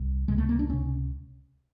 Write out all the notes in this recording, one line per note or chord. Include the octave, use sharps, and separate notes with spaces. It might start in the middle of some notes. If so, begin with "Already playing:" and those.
Already playing: C2
C#2 C3 G#3
A3
A#3
D4
C#2 C3 C#4